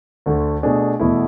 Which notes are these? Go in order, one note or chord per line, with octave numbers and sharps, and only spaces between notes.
D2 D3 A3
B2 A3 D4 G#4
E2 B2 A3 E4